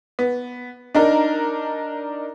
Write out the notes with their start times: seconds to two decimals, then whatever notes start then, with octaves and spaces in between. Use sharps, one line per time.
0.19 B3
0.95 D4 D#4 A#4